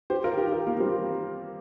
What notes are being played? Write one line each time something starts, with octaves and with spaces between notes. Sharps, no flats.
G4 C5
F4 A#4
D#4 G4
F4 A#4
A#3 D#4
G3 C4